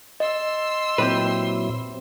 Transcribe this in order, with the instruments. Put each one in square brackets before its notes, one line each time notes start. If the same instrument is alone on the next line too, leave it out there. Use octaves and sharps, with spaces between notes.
[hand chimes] D#5 [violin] C6 E6
[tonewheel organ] A#2 F#3 E4 [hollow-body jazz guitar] C4 G4 B4